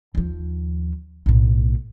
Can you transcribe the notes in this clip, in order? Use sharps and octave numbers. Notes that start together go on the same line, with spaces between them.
D#2 F3
B1 A2